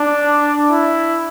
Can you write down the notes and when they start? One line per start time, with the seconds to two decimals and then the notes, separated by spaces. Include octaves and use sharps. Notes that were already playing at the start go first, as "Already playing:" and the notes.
Already playing: D4
0.71 E4